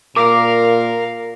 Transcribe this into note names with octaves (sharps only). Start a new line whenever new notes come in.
A#2 A#4 F5 D6